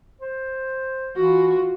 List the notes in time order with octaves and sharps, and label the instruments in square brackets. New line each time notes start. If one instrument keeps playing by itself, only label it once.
[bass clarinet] C5
[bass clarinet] E3 [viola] F4 F#4